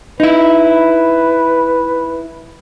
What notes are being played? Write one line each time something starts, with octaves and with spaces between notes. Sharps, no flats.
D#4 E4 B4